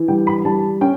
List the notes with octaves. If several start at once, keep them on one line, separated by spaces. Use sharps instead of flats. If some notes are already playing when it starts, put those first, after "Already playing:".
Already playing: E3
G3 G5
B5
G3 A5
C#4 G5